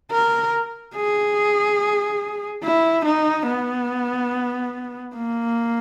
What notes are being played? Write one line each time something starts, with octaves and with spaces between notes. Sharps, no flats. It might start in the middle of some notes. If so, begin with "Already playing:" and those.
A#4
G#4
E4
D#4
B3
A#3